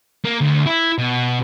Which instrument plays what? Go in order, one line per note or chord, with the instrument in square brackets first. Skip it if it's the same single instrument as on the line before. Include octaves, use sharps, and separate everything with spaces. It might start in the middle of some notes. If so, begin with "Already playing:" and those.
[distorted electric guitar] A#3
D2
E4
B2